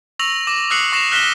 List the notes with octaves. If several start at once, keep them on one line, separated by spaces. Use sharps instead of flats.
C#6 E6 A#6 F7 F#7
D6 A#6
D#6 E6 F#6 C7 C#7 F#7
C#6 A#6 C7 E7 F7
F6 F#6 A#6 B6 E7 G7